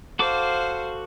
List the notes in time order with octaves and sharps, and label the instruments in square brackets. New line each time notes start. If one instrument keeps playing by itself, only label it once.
[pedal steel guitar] F#4 A4 D6 [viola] C5 F5